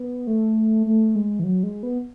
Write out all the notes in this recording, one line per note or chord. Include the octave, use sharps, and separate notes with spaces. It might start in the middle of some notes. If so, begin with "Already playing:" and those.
Already playing: B3
A3
A3
G#3
E3
F#3
G#3
B3